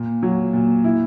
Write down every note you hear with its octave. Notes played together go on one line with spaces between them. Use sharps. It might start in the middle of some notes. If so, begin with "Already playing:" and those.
Already playing: A#2
F#3
A#2
E4